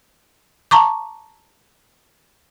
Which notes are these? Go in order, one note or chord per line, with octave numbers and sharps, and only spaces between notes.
A5 A#5 C#6 D6